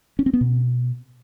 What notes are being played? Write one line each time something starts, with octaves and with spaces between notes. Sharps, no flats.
C#4
C4
B3
B2